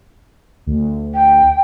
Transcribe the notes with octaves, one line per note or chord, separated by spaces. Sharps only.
D2
G5